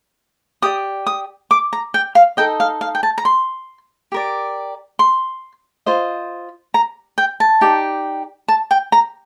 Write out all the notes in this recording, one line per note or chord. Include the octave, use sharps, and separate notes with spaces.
G4 D5 D#6
D#6
D6
A#5
G5
F5
D#4 A4 D#5 G5
F5
F5
G5
A5
A#5
C6
G4 A#4 D5
C6
F4 C5 D#5
A#5
G5
A5
D#4 G4 D5
A5
G5
A#5